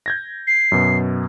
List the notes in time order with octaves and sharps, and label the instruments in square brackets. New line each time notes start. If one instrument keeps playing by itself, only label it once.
[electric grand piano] G6 G#6 A#6
[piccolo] C7
[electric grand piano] F#2 B2